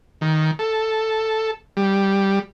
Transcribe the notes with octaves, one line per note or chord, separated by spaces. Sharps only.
D#3
A4
G3